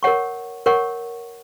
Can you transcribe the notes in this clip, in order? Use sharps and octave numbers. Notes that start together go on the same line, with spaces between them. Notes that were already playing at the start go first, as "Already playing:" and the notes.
A#4 C#5 F#5 C#6
A#4 C#5 F#5 C#6